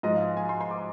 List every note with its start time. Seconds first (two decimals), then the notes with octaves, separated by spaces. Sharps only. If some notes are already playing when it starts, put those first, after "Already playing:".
0.03 G#2 F3 G#3 D#5
0.15 F5
0.37 G#5
0.49 C6
0.61 C6
0.71 D6